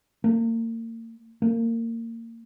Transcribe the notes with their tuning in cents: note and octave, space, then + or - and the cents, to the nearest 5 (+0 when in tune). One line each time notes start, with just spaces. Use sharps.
A#3 -40
A#3 -25